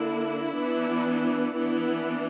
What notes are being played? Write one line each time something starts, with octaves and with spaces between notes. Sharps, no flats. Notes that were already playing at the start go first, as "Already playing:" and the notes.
Already playing: D3 A#3 D4 E4
E3 B3 D4
E3 B3 D4 E4